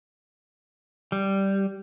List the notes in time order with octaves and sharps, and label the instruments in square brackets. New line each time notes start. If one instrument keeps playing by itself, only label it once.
[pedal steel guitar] G3